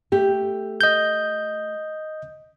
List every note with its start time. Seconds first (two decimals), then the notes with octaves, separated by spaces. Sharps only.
0.12 A3 G4
0.81 D#5 G6